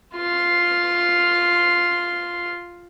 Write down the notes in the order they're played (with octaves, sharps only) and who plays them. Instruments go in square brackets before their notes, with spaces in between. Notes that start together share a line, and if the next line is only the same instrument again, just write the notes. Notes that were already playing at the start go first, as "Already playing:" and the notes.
[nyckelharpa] F4 C6